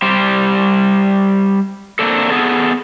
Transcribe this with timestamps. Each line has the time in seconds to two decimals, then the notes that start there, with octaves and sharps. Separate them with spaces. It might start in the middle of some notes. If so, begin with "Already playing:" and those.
0.02 G3 G4 C5
1.99 A#3 C4 D4 A4
2.30 B3 G#4 A4